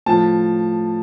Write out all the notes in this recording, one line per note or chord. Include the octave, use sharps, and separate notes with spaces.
A2 F3 A5